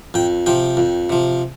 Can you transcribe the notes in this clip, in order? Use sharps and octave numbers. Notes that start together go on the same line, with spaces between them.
F2 G5
C3 F3 G5
F2
C3 F3